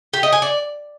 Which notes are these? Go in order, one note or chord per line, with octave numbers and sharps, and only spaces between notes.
G4
D#5
G#5
D5